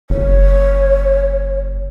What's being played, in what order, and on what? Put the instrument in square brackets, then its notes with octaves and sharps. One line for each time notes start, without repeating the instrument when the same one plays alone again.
[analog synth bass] F#1 [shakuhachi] C#5